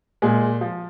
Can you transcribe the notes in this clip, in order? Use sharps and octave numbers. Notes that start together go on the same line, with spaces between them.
A#2 G#3 G#4
F3